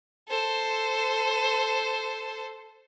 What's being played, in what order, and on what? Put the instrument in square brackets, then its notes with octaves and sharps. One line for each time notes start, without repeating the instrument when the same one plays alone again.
[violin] A4 C5